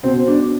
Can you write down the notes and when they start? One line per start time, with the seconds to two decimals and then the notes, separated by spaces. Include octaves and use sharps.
0.03 B2 C4
0.28 D4